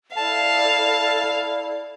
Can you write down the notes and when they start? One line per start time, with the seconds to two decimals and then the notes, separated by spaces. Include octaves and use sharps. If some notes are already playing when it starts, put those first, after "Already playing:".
0.16 E4 A4 D5 F5 A5